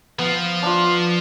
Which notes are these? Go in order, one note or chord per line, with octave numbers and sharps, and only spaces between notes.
F3 B3
D4 F4